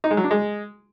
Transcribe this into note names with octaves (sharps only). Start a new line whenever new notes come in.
D#4
G#3
F#3
D4
G#3